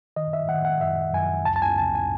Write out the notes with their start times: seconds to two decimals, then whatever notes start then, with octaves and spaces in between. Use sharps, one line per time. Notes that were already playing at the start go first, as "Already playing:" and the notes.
0.16 D#3 D#5
0.33 E5
0.49 D#3 F#5
0.65 F#5
0.81 F#2 E5
1.14 F#2 G#5
1.45 C#2 A5
1.56 A5
1.62 G#5
1.78 C#2 A5
1.95 G#5